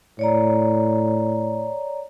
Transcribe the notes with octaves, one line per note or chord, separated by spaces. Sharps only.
A2 C#5 D5 A#5